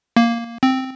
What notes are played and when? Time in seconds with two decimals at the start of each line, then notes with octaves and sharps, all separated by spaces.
0.16 A#3
0.63 C4